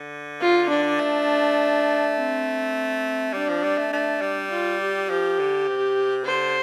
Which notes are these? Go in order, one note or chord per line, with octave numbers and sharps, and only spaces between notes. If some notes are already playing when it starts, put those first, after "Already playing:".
Already playing: D3
F4
D4
A3
C4
G3 D4
F3
G3
A3
A3 D4
G3
F4
G4
F3 G4
D3
C3
D3 C5